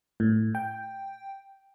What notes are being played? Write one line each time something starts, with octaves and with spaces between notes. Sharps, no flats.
A2
G5